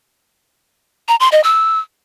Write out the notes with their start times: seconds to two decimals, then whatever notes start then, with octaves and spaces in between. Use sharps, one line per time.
1.08 A#5
1.20 C6
1.32 D#5
1.44 E6